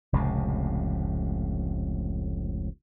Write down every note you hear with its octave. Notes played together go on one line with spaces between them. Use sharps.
F1 C#2 A2 C3